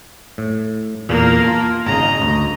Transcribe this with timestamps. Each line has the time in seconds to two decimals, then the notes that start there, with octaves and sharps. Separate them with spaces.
0.38 A2
1.09 E2 A#2 A#3 A#4
1.44 F4 A5
1.87 G#1 C#3 D#5 A#5
2.22 D2